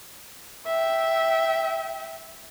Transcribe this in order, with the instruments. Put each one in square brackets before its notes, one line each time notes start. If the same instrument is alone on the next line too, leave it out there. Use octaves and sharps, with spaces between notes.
[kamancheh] E5 G5